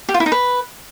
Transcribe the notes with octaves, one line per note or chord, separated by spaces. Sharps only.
G4
F4
E4
D#4
B4